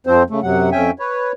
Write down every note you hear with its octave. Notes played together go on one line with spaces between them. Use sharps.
F2 F3 C4 C5
C#3 A3
F#2 C3 F#3 F#5
F2 C#4 E5 G5 G#5
B4 C#5